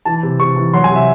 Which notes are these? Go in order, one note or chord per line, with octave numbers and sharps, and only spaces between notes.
E3 A5
C3
C3 C#6
E3
F#3 C6
G#5
C3
E5